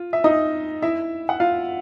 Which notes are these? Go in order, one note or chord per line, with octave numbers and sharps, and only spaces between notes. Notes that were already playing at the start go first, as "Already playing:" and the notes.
Already playing: F4
E5
D#4 D#5
E4 E5
F#5
F4 F5